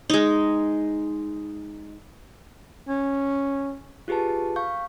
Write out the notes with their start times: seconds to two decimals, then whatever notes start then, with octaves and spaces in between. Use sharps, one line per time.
0.10 G#3 D#4
2.88 C#4
4.08 F4 G4 G#4 B4 A5
4.56 F5 C#6 G6